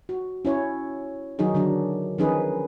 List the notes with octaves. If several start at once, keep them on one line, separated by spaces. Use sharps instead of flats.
F#4
C#4 E4 C#5
D#3 F#3 D#4 F#4 G#4
D3 D#3 F#3 D4
D#3 F3 C#4 D#4 G#4 B4